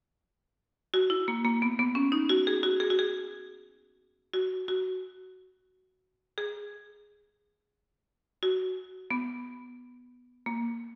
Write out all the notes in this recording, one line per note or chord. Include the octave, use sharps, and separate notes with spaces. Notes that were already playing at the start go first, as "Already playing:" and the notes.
F#4
E4
A#3
A#3
B3
B3
C#4
D#4
F#4
G#4
F#4
G#4
F#4
G#4
F#4
F#4
G#4
F#4
B3
A#3